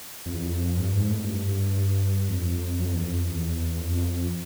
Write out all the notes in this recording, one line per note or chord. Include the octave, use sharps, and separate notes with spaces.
F2
E2
F2
G2
G#2
A2
F#2
G2
F2
F#2
F2
E2
F2
E2
F2